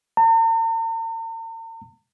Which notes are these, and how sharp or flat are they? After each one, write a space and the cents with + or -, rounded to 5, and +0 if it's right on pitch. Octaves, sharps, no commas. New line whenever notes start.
A#5 -45